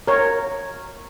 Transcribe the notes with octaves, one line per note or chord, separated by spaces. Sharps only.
A#4 C#5